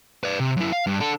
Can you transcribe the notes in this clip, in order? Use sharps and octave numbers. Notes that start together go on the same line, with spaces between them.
B4 D5
C3
F#2 E4
F5
G2
D4 A4